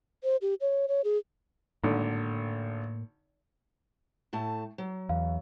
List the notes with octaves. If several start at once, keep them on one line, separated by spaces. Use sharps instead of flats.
C5
G4
C#5
C#5
G#4
G#1 A2 D3 A#3
A2 A3 A5
F#3
E2 F5